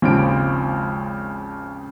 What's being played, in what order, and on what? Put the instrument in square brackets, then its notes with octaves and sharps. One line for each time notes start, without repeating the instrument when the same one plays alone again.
[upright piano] G#1 D#2 C#3 F3 C4 D7